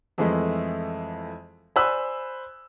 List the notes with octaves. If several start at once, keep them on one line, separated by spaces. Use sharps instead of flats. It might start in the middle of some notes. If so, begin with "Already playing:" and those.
F2 E3 G#3 A3
C5 D5 G#5 B5 E6 F#6